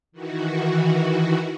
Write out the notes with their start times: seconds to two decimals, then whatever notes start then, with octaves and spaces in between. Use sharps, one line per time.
0.12 D#3 E3 F#4